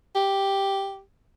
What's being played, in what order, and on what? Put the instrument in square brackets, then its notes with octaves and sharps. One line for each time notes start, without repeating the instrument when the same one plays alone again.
[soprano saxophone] G4